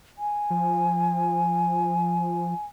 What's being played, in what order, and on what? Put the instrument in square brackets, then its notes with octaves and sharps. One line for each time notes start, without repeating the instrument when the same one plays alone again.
[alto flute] G#5
[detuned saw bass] F3